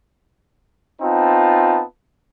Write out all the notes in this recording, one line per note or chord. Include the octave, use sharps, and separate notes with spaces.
B3 C4 D#4 F4 A5